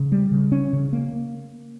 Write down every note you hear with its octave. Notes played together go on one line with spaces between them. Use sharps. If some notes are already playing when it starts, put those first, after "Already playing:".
Already playing: C#3
G3
C#3
C#4
C#3
A#3